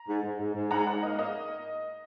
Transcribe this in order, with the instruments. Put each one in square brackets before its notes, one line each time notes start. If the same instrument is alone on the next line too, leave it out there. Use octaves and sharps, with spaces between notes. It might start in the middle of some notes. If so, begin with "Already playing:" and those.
Already playing: [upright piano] A#5
[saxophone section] G#2
G#2
G#2
G#2
[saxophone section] G#2 [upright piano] F#5 A#5
[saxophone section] G#2 [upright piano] F#5
[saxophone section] A#3 [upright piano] D#5
[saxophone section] A#3 [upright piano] D#5